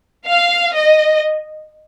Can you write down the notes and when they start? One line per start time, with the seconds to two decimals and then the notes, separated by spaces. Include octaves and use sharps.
0.27 F5
0.75 D#5